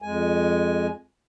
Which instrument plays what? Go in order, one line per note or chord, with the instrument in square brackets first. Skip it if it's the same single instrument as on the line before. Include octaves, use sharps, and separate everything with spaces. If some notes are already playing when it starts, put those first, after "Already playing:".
[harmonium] F2 G#3 G#5